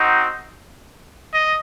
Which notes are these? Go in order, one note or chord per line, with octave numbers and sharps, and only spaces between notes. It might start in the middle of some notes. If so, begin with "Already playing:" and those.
Already playing: C4 D#4 F#4
D#5